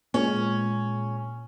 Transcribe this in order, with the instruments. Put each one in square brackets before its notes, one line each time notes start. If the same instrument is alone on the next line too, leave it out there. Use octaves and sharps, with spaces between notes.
[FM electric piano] A#2 G#3 [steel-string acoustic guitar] C#4